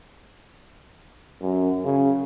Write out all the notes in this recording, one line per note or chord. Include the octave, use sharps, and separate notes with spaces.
F#2
C#3